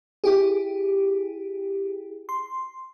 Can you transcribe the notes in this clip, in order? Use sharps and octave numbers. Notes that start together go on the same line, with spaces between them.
E4 G4 G#4
C6